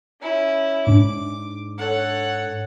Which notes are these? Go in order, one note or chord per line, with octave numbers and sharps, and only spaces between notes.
C#4 E4
G#2 D4 D6
A4 C#5 F#5